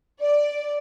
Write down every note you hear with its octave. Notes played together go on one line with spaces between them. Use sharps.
D5